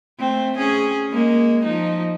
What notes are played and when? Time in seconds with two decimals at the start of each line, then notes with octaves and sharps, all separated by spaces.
0.19 A3 C4
0.57 C#4 G#4
1.11 G#3 A#3
1.65 F3 D#4